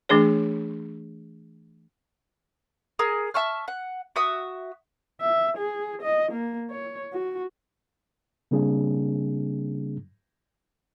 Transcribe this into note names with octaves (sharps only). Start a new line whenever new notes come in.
E3 A3 D4 G#4 C#5
G#4 A#4
E5 A5 C#6 F6
F#5
F#4 E5 D#6
E5
G#4
D#5
A#3
C#5
F#4
C#3 G3 A#3 C4 D4 G#4